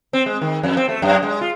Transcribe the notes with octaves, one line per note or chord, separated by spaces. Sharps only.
C4
G#3
D#3
F2
C4
A3
F#2
G#3
F4